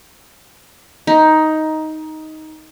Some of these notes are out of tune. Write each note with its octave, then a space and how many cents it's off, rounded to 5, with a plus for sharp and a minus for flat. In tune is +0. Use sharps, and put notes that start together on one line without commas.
D#4 +10